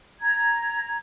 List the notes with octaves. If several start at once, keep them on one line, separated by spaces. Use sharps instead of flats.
A#5 G#6